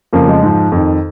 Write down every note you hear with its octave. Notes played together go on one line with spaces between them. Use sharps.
F2 C#3 F3 A#3
G#3
G#2 F3
F2 D#3